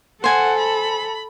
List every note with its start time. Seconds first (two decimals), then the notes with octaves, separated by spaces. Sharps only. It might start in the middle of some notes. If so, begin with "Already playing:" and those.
0.24 A4 C5 F#5 G#5
0.59 B5